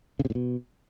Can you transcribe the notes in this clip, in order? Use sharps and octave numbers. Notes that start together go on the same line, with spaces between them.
C#3
C3
A2
B2